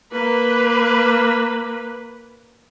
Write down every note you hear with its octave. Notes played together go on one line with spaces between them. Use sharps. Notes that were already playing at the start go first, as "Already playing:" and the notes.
A#3 B4